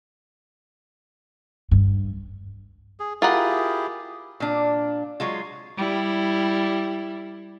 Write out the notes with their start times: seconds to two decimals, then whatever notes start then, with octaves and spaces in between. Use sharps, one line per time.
1.71 G2
3.00 G#4
3.22 E4 F4 G4 G#4 A#4 F#5
4.40 A#2 D4
5.20 F#3 G#3 F4
5.78 G3 E4